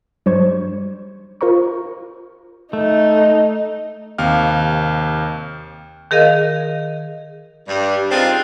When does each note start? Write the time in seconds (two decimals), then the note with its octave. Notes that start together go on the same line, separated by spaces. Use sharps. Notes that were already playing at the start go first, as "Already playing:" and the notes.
0.26 G2 F#3 G3 C5 C#6 G#6
1.41 F4 A#4 C5 A#5 C#6
2.73 A3 D#4
4.18 D#2 C3 F5 F6
6.11 D#3 G#4 A#4 D#5 F5
7.68 G2 G3
8.11 C4 D4 D#4 F4 G#4 C5